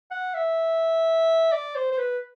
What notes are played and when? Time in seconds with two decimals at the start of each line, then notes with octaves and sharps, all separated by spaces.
0.11 F#5
0.34 E5
1.52 D5
1.75 C5
1.92 C5
1.98 B4